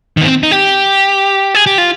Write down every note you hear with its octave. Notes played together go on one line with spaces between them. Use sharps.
D#3 B3
C4
D#4
G4
G#4
G4
F4